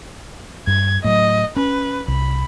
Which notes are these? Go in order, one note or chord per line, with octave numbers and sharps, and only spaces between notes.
G2 G#6
A2 F#3 D#5
C#4 B4
C2 B5